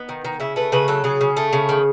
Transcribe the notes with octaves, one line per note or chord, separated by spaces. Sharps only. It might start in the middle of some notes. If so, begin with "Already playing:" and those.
Already playing: B3 D#4
D#3
D#3
C#3 E4
A3 B4
C#3 B4
F#3 A4
C#3 G#4
C#3
A3
C#3
D#3